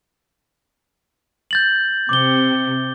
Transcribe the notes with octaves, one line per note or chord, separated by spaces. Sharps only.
G6 A6 F#7
C3 D6 G7